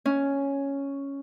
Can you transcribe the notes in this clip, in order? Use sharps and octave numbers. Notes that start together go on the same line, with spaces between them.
C#4